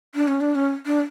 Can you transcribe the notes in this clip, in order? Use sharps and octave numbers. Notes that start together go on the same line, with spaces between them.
D4
C#4
D4
C#4
D4